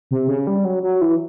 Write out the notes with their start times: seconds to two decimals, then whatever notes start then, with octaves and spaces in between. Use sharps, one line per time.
0.11 C3
0.28 C#3
0.47 G3
0.65 F#3
0.83 F#3
1.01 E3